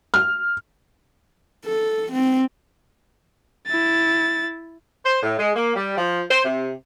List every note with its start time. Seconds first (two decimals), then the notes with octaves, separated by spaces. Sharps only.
0.14 F6
1.65 A4
2.12 C4
3.67 E4 A6
5.05 C5
5.22 A2
5.39 G#3
5.56 A#3
5.76 G3
5.97 F3
6.30 C5
6.45 C3